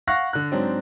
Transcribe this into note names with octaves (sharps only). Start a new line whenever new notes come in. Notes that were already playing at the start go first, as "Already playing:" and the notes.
F5 F#5 C#6 F#6 A#6
D3 F#6
G#2 F#3 C4 D4